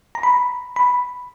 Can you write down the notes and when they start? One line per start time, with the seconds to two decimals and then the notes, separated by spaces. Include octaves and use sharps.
0.15 A#5
0.23 B5
0.76 B5